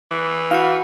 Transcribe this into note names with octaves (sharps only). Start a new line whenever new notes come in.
E3
E4 F#4 F5 F#5